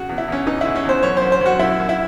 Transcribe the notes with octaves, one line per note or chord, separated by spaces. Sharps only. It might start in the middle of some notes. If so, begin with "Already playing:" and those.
Already playing: C#3 F#4
E2
E4
E2 C#4
E3 D#4
C#3 E4
C#4
E2 C5
F#2 C#5
F#2 C5
C5
F#2 F#4
F#2 E4
F#2
E4